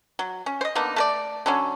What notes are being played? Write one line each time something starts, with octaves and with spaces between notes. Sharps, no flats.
F#3
C#4
C5 D#5
D3 A#3 B3 D#4
A3 A#4 D5
D3 F#3 C#4